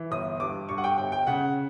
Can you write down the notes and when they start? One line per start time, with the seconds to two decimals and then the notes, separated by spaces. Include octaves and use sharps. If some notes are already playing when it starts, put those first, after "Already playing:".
Already playing: E3
0.11 G1 D#6
0.40 G2 D6
0.69 G2 C#6
0.78 F#5
0.84 G5
0.98 G1 G5
1.12 G5
1.27 C#3 F#5